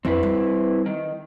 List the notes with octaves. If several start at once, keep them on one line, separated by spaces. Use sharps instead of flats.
F2 D3 C4 E4 B4
G3
D#3